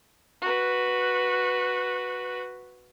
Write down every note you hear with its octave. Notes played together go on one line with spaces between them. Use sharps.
F#4 B4